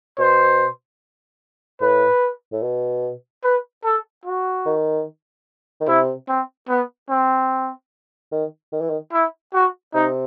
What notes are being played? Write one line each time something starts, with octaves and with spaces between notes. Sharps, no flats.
B2 C5
A2 B4
A2
B2
B4
A4
F#4
D#3
D#3
C3 E4
C4
B3
C4
D#3
D#3
E3
D#3
E4
F#4
C3 D#4